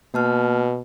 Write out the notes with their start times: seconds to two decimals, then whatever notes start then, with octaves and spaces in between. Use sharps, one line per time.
0.14 B2 A#3 A5 F6